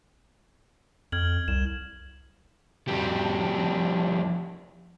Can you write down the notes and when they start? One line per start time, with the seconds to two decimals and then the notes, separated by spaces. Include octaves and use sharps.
1.12 F2 F6 G#6 F#7
1.48 C2 E7
2.88 F2 G3